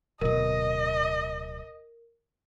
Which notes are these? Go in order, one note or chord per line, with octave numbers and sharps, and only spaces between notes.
D1 B2 A#4 D#5